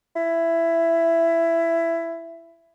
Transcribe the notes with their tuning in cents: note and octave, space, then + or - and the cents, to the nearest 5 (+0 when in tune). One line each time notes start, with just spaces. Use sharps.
E4 +15